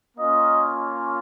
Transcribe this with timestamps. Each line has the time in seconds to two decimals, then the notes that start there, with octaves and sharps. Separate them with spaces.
0.17 A#3 C#4 F4 D#5